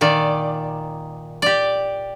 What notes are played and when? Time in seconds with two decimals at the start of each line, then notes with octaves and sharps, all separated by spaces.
0.01 A#2 D#3 D5
1.42 G4 D5